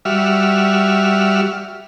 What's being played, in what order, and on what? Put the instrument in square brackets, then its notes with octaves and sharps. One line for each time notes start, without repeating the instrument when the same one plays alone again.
[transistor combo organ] G3 F#4 E5 F6